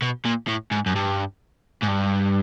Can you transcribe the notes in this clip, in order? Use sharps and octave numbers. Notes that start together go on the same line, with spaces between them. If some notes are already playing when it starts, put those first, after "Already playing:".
B2
A#2
A2
G#2
F#2
G2
G#2
G2